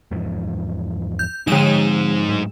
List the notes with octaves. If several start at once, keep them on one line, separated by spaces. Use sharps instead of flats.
E2 G#2 F3
G6
G#2 D3 F3 D#4 E7
A2 F#3